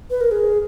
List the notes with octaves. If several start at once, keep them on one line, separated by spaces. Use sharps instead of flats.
B4
A#4
G#4